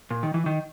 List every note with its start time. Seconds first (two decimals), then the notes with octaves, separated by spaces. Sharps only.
0.11 A#2
0.23 D#3
0.34 E3
0.46 D#3